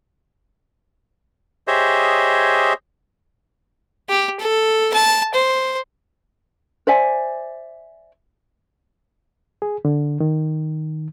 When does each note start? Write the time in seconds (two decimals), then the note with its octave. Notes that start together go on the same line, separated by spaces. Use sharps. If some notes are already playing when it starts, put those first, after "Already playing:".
1.68 G4 G#4 C5 C#5 D#5 E5
4.09 G4
4.40 A4
4.94 A5
5.34 C5
6.87 C5 D5 E5 G#5
9.62 G#4
9.85 D3
10.20 D#3